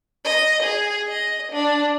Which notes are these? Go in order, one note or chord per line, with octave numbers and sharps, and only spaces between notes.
D#5
G#4
D#5
D4